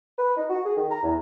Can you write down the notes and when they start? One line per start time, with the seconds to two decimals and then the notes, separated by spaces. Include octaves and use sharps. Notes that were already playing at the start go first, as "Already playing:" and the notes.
0.19 B4
0.37 D#4
0.50 F#4
0.65 G#4
0.77 D#3
0.90 A#5
1.03 E2